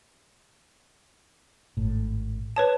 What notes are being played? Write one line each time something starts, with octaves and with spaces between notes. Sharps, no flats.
G#1 A2
B4 C#5 A5